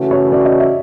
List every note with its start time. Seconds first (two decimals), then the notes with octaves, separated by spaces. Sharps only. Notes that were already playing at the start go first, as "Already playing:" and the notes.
Already playing: C#3 E3 A3 C#4 F#4
0.11 C#5
0.32 D5
0.45 D#5
0.60 E5